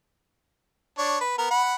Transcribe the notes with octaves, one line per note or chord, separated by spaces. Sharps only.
D4 C#5
B4
B3 A#4
F#5 B5